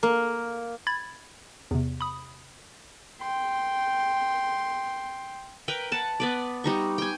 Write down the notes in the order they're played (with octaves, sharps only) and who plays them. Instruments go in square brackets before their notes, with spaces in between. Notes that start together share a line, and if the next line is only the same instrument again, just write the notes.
[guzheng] A#3
[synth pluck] B5 G#6 A6
E2 C3
B5 D#6
[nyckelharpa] G5 C6
[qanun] A#4 B4 G5
B4 F#5 A5
B3 B4 D5
G3 D#4 C#6
G5 G#5